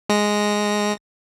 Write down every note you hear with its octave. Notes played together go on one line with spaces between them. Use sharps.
G#3 A#6